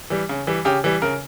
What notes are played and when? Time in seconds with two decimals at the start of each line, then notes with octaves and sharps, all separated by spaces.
0.10 E3 G3
0.29 C#3
0.47 E3 G3
0.65 C#3 G4
0.84 E3 G3
1.02 C#3 A#4